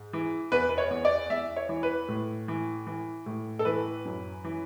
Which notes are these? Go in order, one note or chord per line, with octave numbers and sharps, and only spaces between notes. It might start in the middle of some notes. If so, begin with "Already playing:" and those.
Already playing: G#2
E3
E2 B4
B4
C#5
E2
D5
E2 E5
C#5
E3
B4
A2
E3
E3
A2
A4
E3 B4
F#2
E3